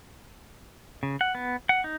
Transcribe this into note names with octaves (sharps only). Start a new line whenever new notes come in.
C#3
F#5
B3
F#5
D#4